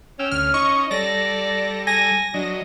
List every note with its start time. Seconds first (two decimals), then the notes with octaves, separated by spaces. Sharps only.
0.19 C#4 G5 E6 F6
0.31 D2 F6
0.54 D#4 D#5 C#6
0.91 G3 A4 D5 A#6
1.87 G#5 A#6
2.34 F#3 D4 D#5